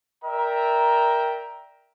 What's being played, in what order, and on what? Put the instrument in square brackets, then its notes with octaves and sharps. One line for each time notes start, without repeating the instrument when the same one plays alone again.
[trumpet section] A#4 D5 E5 G5 A#5